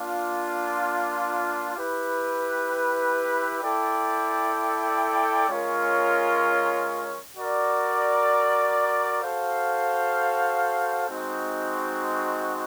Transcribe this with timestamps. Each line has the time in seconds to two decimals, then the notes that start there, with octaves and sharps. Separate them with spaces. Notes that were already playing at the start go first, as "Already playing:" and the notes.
Already playing: A#3 D4 F4
1.76 E4 G4 B4
3.63 E4 A4 D5 G5
5.49 G#3 C#4 F4 A#4 C#5
7.36 F#4 A#4 D5
9.23 F#4 A4 C5 F5
11.10 G#3 C4 D#4 F#4